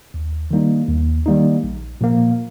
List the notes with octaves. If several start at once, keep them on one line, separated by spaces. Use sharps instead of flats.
D#2
D#3 G3 A#3 D#4
D#2
D#3 G3 A#3 D#4
A#1
A#2 F3 A#3